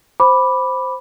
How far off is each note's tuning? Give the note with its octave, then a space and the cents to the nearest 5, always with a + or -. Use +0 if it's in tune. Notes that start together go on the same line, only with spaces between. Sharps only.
C5 +0 B5 +0 D6 +0